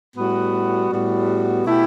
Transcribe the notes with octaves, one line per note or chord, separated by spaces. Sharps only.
A2 G3 B3 F#4
A2 G3 B3 F#4
B2 A3 E4 G4